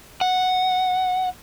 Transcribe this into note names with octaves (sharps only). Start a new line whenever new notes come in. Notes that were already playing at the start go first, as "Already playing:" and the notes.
F#5